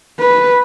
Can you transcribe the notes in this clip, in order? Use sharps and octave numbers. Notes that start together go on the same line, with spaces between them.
B4